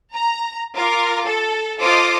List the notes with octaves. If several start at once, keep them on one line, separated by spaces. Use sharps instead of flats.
A#5
F4 A#4 D6
A4
F4 A4 C5 D#5 D6 D#6